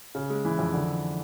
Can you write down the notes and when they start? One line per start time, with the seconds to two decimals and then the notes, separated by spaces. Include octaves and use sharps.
0.15 C#3
0.30 G#3
0.45 E3
0.59 F2
0.73 D3